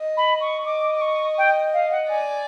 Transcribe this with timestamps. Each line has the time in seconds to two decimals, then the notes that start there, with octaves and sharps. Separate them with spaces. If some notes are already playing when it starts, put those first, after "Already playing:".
Already playing: D#5
0.17 B5
0.40 C#6
0.65 D#5 D6
0.96 D6
1.01 C#6
1.37 G5
1.73 F5
1.91 F#5
2.09 D5 G#5